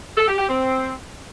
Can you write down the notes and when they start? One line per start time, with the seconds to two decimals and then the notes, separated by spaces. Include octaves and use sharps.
0.17 A4
0.28 G4
0.38 G4
0.49 C4